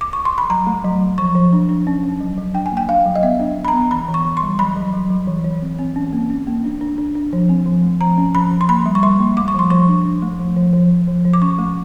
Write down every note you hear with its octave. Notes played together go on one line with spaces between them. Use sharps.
D6
C#6
C6
B5
F#3 A#5
A3
F#3
F#3
F3 C#6
F3
D4
D4
C#4
C#4
F#3
F#3
D4 G5
G#5
A#3
G5
D4 F5
F#3
D#5
B3 E5
D4
B3
B5
A#5
B3
E3 B5
E3
C#6
E3
C6
G3
F#3 B5
F#3
F#3
F#3
E3
E3
C4
C4
C#4
A#3
C#4
A#3
D4
D4
D4
D4
F3
C4
F3
A3
F3 A#5
C#4
F3 B5
F3
C6
A#3 B5
G3
C#6
G3 C6
A#3
A3 D6
C#6
F3 C6
F3 C#6
D4
D4
A3
F3
F3
F3
F3
F3
F3
D6
C#4 C#6
A3